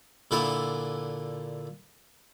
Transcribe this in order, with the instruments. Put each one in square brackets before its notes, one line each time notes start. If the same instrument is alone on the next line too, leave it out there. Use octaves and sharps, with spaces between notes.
[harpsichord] A#2 D3 E4 F4 G#5